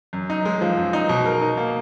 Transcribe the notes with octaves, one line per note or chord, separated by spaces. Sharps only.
F#2
D#4
G#3
F3
F#2
D#4
B2
A#4
D#4
A#3